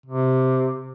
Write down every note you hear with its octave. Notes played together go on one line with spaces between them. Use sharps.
C3